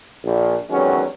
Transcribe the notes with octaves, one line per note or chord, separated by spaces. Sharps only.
A#1
E2 C3 D#3 F#3 G#3 C#4